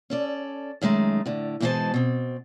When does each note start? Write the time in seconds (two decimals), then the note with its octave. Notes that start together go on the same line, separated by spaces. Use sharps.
0.10 C#4 A4 D5
0.82 F#2 D#3 G#3 A3
1.26 A2 D3
1.60 G#2 B2 E3 G#3 C5 A5
1.94 B2 C4